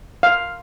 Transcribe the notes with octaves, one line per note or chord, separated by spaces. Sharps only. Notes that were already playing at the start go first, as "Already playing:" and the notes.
F5